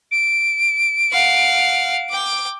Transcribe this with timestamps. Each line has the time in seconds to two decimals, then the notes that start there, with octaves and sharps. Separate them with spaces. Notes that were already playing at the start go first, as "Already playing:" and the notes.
0.12 D7
1.12 F5 F#5
2.10 G5 D6